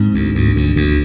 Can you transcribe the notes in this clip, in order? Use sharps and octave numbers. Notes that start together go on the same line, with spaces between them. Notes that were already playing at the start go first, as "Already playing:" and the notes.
Already playing: G#2 C4
D2
D2
D2
D2